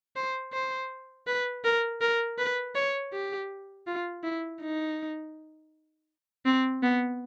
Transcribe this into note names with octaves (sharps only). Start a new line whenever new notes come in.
C5
C5
B4
A#4
A#4
B4
C#5
G4
F4
E4
D#4
C4
B3